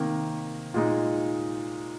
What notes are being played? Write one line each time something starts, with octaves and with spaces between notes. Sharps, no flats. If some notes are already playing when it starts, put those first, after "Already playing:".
Already playing: C3 D#3 A#3
A#2 G#3 D#4